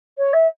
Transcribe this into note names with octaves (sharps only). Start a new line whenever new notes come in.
C#5
E5